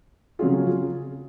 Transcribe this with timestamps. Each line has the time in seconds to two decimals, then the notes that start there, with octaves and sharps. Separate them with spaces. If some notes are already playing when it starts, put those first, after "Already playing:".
0.39 C#3 F#3 C#4 F4 G#4